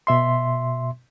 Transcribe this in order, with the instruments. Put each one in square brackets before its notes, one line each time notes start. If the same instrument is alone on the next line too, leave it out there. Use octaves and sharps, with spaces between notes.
[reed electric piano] B2 E5 C6